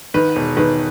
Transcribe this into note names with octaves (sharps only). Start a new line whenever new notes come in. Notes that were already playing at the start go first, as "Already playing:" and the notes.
D#3 B4
E1
D#3 B4